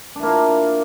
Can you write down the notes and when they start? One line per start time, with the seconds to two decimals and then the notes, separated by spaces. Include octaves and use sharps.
0.16 D4
0.19 E4
0.23 A#3
0.27 F4